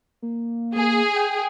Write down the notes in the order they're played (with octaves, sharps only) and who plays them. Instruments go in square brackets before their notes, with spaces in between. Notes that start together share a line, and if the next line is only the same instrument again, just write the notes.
[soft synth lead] A#3
[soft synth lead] A#3 [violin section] G#4
[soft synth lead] G5